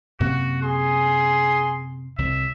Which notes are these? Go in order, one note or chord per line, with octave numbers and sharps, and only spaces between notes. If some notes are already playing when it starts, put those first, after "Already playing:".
F#2 C3 A#3 F#4
G#4 C6
C2 E5